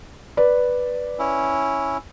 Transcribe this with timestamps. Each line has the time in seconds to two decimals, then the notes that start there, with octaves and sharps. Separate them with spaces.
0.37 B4 D5
1.19 C#4 E4